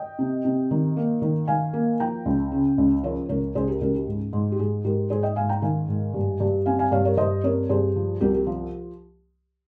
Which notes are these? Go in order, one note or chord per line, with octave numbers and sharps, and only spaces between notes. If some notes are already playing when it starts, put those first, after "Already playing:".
Already playing: D#5 G5
C3
C3
D#3
A#3
D#3
D#3 F5 G#5
A#3
F3 G5 A#5
C#2
C#3
C#2
F3 A#4 C#5
C#2 A#4 C#5
C#2 G#4 C5
G4 A#4
C#2 G4 A#4
G4
G#2
G#2
G4
G#2 G#4
G#2 G4 A#4
G#2 G#4 C5
D#5 G5
G#2 F5 G#5
G5 A#5
D#3 F5 G#5
G#2
G2
G2
C4 F5 G#5
F5 G#5
G2 C#5 F5
A#4 C#5
G2 C5 D#5
C4 A#4 C#5
G2 G#4 C5
F3
C2 G4 A#4
G4
F3